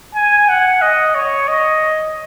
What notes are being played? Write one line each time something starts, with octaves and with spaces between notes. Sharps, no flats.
G#5
F#5
D#5
C#5
D#5